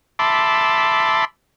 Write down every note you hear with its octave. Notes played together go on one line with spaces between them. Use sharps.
E5 A5 B5 C6 D6